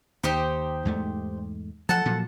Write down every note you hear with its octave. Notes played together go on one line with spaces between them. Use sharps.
D#2 D#4 G4 C5
E2 G#2 A3
F3 A4 F#5 A5
A#2 F3 F#3